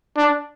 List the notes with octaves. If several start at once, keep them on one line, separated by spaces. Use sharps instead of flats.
D4